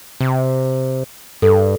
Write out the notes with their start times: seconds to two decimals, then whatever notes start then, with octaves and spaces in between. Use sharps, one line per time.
0.21 C3
1.42 G2 A4